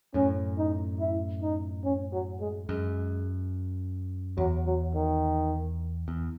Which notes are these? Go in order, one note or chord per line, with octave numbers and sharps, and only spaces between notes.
F#2 A2 C#4
D#4
E4
D#4
C#4
F#3
G#3
F#2 G#3
E2 F#3
F#3
D#3
E2